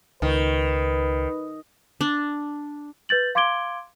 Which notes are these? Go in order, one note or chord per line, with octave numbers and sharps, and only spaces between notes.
C#2 D#3 B4
D4
B4 G6 A6 F#7
F5 C6 D6 G#6 D7 G7